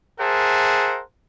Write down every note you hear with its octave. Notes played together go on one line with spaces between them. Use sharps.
G#4 A#4 C5 E5 F#5 A5